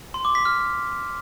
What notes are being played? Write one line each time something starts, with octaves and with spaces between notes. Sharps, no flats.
C6
D6
B6
F6